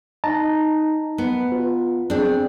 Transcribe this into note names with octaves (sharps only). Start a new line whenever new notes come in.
D#4 D#5 A5 A#5
B3 B4
F4
C4 D4 G#4